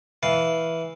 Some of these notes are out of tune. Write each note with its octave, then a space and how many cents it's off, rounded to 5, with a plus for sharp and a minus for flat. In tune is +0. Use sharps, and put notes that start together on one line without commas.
E3 -10 F5 +0